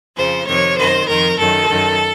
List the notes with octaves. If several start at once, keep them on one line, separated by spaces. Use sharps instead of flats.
F2 C#3 F3 C5
F2 C3 D#3 C#5
F#2 D#3 C5
F2 D#3 A#4
F#2 D#3 A4
F#2 D#3